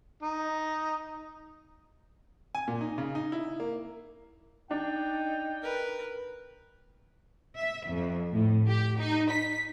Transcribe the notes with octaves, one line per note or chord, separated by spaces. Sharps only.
D#4
G#5
A#2
D#4
C#3
D#4
E4
A#3
D4 D#4 G5
A#4 B4
E5
F2
A2
G4
D#4
B6